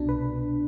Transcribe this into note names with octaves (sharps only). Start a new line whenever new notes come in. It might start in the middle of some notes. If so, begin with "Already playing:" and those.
Already playing: C2 B2 D4
B4